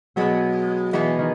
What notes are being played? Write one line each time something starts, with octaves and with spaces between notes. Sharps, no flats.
B2 F#3 G#3 B3
B2 E3 G#3 B3
D#3